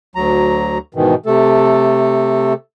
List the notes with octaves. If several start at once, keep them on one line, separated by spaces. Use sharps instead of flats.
D2 F#3 A#5
G#2 B2 D#3 E3
C3 A3 A4